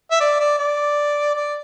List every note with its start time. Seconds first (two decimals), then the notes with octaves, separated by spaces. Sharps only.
0.11 E5
0.21 D5
0.40 D5
0.59 D5
1.35 D5